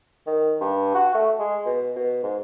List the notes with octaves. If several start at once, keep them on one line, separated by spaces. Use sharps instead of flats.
D#3
G2
F#4
A3
G#3
B2
B2
G#2